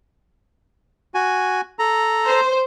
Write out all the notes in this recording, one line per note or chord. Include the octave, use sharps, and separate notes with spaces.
F#4 G#5
A4 A#5
C5